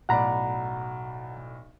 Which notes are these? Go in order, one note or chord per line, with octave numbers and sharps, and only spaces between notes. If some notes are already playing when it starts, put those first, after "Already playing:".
B1 A2 D5 F#5 A#5 B5